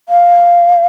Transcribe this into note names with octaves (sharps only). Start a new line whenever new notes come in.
F5